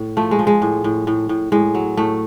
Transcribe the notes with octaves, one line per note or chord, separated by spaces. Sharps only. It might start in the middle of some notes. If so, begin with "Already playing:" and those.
Already playing: A2
F3 A3
G#3
F3
G#3
A2
A2
A2
A2
A2 G#3
F#3
A2 A3